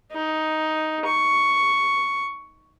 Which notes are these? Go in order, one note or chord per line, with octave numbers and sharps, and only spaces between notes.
D#4
C#6